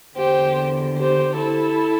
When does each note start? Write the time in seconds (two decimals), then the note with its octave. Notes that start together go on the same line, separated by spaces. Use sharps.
0.16 E2 D3 G4 C5
0.97 G4 C5
1.38 E4 A4